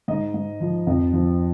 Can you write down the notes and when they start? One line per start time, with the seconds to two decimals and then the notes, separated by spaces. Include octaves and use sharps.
0.08 G#2 D#5
0.34 G#2
0.60 F3
0.87 F2
1.13 F3